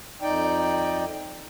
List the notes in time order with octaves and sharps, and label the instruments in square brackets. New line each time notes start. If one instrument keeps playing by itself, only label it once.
[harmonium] F2 D#4 D5 G5